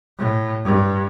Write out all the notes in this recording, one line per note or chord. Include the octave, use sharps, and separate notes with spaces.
A2
G2